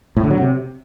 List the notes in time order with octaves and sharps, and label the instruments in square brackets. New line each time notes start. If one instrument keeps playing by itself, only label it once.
[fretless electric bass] A2
D3
F#3
C3